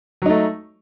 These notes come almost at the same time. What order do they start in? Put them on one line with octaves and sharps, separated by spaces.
F#3 D#4 A3